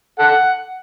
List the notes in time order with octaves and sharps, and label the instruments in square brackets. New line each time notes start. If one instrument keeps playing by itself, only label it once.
[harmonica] A4 F#5